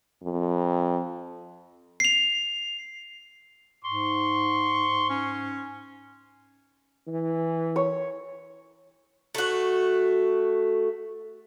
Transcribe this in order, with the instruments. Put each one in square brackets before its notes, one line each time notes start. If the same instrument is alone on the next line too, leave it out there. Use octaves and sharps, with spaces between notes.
[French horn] F2
[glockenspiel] C7 F7
[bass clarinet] G#2 [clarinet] C6 [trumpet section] C#6
[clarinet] C#4
[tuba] E3
[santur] C#5
[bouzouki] A3 F#4